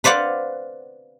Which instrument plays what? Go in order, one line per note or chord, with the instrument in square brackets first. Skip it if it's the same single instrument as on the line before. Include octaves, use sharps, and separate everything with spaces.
[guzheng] B4 C5 D5 F5 F#5